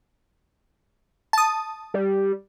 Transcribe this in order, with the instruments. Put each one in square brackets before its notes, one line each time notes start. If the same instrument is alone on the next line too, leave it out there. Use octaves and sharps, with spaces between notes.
[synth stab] A5 D#6
[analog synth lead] G3